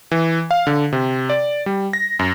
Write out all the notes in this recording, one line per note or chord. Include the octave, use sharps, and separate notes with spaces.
E3
F5
D3
C3
D5
G3
A#6
F#2